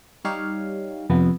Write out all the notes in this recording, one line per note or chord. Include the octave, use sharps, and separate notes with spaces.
G3 D#4 G4 C#5 F5
F2 C3 F3 B3